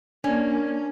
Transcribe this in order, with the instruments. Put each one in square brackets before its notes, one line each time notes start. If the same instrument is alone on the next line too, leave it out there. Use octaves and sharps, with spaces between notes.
[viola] A#3 [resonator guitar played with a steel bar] C#4 [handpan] D4